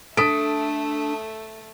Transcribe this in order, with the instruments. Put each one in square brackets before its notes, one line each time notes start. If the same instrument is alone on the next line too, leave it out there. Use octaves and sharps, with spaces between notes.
[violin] A3 E5 [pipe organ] D4 [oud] A4 [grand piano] D#6 B6 D7